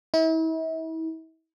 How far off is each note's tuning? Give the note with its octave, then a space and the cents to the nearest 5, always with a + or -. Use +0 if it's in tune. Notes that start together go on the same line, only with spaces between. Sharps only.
E4 -40